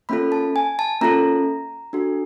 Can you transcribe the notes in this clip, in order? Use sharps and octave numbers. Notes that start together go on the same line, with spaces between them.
A#3 C#4 F4 A4 B5
A5
G#5
A5
A#3 C#4 F4 A4 A#5
D4 F#4 A4